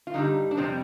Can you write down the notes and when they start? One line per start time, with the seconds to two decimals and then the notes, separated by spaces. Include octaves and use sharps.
0.07 F4
0.14 G2 D3 G3 D#4
0.51 D4
0.57 F2 C3 G3 C4